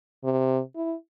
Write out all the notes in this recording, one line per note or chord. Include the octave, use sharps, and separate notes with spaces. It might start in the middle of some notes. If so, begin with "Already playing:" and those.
C3
E4